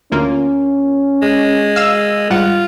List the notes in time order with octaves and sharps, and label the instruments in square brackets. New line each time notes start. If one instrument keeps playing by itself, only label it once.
[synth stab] D2 A#3 F4 [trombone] C#4
[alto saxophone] G#3
[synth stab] F5 E6
[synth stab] G#2 G3 F#5 [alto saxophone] F4